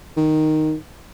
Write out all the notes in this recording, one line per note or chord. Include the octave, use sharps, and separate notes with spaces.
D#3